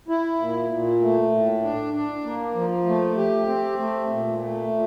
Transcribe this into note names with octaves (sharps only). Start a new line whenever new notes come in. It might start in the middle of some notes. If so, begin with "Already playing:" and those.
E4
A#2
A#2
A3
A2
D4
D4
A#3
F3
A3
G4
C4
A3
A#2
A3
A#2